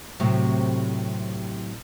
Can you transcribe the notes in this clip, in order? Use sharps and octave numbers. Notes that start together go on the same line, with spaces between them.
A2 C3 F#3